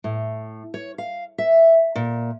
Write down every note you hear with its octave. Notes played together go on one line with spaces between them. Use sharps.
A2
C#5
F5
E5
A#2